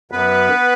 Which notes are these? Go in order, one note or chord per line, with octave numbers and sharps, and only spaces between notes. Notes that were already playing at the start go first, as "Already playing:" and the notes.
F#2 B3 B4